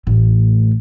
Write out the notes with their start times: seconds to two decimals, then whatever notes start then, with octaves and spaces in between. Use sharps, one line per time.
0.07 A1 A2